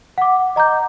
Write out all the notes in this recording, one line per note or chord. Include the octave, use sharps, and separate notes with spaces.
F#5 D6
D#5 A#5 D6 G6